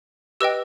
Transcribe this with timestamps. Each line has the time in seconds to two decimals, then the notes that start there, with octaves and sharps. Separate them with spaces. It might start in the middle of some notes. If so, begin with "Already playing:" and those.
0.41 G4 B4 D#5 G5 E6